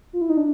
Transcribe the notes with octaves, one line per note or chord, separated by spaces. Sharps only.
F4
E4
D#4
D4